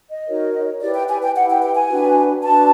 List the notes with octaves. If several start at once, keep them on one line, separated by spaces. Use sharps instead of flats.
D#5
D#4 F#4 A#4 C#5
E4 G4 B4 D5
G5
G#5
G5
E4 G4 B4 F#5
G5
G5
G#5
D4 F#4 B4
D4 F#4 B4 A5